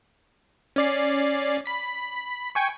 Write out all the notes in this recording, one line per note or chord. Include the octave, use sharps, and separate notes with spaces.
C#4 D5 C7
B5 B6
G5 G#5 C#6